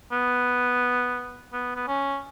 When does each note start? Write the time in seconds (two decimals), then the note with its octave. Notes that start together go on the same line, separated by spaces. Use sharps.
0.12 B3
1.53 B3
1.76 B3
1.88 C#4